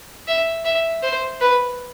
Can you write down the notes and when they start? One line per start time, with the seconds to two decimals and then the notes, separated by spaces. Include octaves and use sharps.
0.28 E5
0.65 E5
1.03 C5
1.40 B4